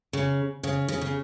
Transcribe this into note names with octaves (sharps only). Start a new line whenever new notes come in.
C#3
C#3
C#3
C#3